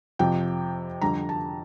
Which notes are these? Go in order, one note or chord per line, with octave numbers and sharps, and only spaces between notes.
F2 C3 F3 G5
F2 D3 G3 A#5
A5